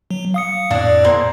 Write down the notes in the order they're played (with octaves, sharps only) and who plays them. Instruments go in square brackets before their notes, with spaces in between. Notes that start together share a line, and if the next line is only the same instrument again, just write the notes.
[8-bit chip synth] F#3
F5 D#6 C#7
[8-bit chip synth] F2 A2 [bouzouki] D4 D5
[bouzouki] A#3 C4 G#4